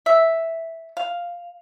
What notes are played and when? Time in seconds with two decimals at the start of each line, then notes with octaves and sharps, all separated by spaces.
0.06 E5
0.97 F5